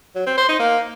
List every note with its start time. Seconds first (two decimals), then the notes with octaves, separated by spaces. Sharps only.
0.15 F#3
0.26 C4
0.37 C5
0.48 D#4
0.59 A#3